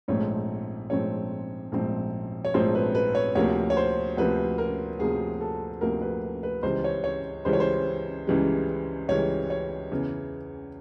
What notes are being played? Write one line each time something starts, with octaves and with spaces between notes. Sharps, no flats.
A#1 G#2 F3 A3 C4 C#5
A#1 G#2 F3 A3 C4 C#5
A#1 G#2 F3 A3 C4
C#5
A#1 G#2 F3 A3 C4 C5
B4
B4
C#5
D2 C3 F3 A#3 C#5
C#5
C5
D2 C3 F3 A#3 B4
A#4
D2 C3 F3 A#3 G#4
A4
D2 C3 F3 A#3 A#4
B4
B4
C#2 C#3 E3 G3 C5
C#5
C#5
C#2 C#3 E3 G3 C5
C#5
C5
C#2 C#3 E3 G3
C#2 C#3 E3 G3 C#5
C#5
E2 C#3 E3